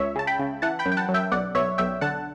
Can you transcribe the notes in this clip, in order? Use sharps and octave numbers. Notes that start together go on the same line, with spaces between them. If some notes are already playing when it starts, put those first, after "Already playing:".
Already playing: C#2 C#5 E5
C#3 A5
G5 B5
C#3
E3 F#5 A5
G5 B5
F#2
G5
F#5 A5
F#2
E5 G5
B1 D5 F#5
B1 C#5 E5
B1 E5 G5
D3 F#5 A5